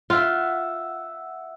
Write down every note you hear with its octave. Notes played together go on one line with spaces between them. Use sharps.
F4 E5 F#5